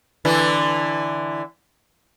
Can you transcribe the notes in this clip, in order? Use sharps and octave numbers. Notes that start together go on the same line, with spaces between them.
D3 E3 E4